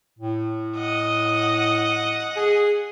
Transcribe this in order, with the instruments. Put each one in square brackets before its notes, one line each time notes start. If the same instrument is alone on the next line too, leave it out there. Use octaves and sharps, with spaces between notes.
[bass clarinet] A2
[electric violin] D#5 F#5
[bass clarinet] G#4